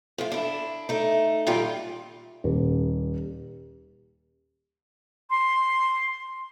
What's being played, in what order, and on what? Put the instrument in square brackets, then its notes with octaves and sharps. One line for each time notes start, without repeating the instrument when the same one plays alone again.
[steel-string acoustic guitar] A2 A3 F4
D4 E4
A3 D#4
A#2 D#3 G3 F4 G4
[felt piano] D#1
[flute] C6